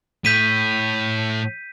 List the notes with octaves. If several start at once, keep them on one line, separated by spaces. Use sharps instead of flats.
A2 G6 B6 D#7